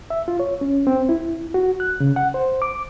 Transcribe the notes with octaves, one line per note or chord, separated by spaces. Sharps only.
E5
F4
C#5
C#4
C4
E4
F#4
F#6
C#3
F#5
C5
D6